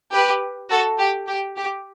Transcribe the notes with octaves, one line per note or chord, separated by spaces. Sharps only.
G4 B4
F#4 A4
G4
G4
G4